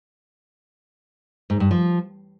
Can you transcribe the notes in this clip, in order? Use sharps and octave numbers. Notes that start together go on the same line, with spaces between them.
G#2
G2
F3